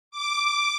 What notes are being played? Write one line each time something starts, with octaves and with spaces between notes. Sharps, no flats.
D6